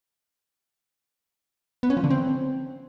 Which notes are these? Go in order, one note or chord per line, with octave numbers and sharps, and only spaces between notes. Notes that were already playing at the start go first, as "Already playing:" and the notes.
B3
C#4
F3
D3
C4